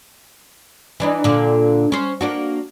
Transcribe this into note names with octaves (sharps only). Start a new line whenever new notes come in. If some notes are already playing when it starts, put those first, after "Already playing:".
E3 D4 D#4
A#2 D3
C#4 C5
A#3 D4 F#4